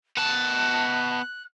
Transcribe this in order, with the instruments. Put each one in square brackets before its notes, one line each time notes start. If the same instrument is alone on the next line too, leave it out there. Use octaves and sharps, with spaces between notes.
[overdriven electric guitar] B3 A5 [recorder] F#6